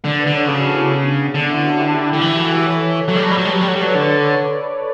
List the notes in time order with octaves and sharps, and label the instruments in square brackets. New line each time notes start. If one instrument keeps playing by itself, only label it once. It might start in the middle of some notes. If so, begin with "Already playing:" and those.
[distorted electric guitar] D3 [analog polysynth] B4 D5
[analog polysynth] B4 D5
[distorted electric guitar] D3
[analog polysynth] A4 C#5
[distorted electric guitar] C#3 [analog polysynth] F#4 A4
[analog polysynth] D4 F#4
C#4 E4
B3 D4
C#4
B3 D4
B3 D4
[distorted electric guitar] D3 [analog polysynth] B3 D4
[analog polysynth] C#4 E4
D4 F#4
E4 G4
E4 G4
E4 G4
[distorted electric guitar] D3
[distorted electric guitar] E3 [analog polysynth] E4 G4
[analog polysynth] F#4 A4
G4 B4
A4 C#5
[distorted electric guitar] F#3 [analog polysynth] A4 C#5
[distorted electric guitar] G3
[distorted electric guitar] F#3 [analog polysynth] B4 D5
[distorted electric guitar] G3
[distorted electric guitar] F#3 [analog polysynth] A4 C#5
[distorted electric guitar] G3
[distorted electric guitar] F#3 [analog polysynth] G4 B4
[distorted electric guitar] G3
[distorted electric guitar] F#3 [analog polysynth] A4 C#5
[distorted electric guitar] G3
[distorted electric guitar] F#3 [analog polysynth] B4 D5
[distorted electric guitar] D3